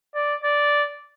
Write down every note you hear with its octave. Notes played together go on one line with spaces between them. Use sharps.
D5
D5